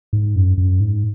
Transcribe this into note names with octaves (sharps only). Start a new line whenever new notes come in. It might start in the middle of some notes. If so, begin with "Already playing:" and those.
G#2
F#2
F#2
G#2